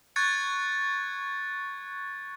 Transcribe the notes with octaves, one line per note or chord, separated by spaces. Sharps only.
C#6 F#6 G#6 A6 C#7